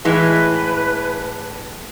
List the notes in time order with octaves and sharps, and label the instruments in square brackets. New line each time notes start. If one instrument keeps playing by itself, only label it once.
[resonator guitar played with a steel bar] A2 E3 G#3 [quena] B4